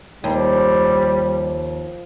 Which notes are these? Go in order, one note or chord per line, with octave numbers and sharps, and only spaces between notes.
D#2 F3 G3